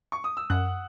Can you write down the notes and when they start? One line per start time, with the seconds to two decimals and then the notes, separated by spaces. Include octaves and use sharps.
0.12 C#6
0.24 D#6
0.37 E6
0.50 F#2 F#5 F#6